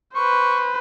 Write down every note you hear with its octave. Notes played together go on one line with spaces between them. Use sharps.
B4 C5 C#6